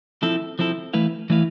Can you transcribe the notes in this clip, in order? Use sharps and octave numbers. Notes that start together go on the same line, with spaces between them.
F3 C4 E4 A4
F3 C4 E4 A4
E3 A3 E4 B4 F5
E3 A3 E4 B4 F5